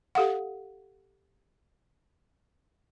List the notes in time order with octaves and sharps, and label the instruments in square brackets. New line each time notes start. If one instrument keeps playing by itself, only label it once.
[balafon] G4 A4 F5 F#5